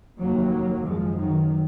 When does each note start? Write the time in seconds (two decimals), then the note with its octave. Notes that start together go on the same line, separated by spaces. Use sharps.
0.18 F1 D#2 F#3 A#3
0.85 G#1 F#2 F3 G#3
1.19 D#3 F#3